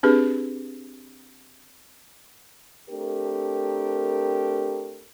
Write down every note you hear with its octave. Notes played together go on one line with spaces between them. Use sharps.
C4 D4 G4 G#4 B4
A3 C4 D4 G4 A#4